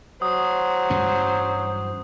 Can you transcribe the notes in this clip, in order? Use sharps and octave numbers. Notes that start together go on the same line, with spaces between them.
F#3 C5 D#6
G2 E3 C#4